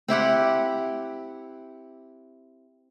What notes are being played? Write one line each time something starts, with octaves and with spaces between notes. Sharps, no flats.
C4 E4 G4 F#5